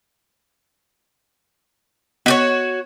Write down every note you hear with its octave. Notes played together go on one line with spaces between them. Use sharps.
B3 F#4 G4 C#5 D#5 B6